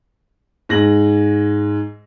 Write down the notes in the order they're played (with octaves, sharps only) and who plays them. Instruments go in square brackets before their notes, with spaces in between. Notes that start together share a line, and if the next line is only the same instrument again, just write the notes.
[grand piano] G#2 A#6 F#7